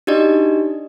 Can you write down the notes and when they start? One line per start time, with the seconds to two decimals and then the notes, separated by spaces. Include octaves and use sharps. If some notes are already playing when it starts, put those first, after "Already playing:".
0.07 D4 D#4 F#4 G4 D5 D#5